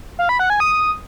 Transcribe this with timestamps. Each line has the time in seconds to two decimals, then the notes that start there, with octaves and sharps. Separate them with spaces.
0.19 F5
0.29 B5
0.39 F#5
0.50 G#5
0.60 D#6